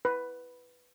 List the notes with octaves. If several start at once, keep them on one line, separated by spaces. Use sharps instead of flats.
B4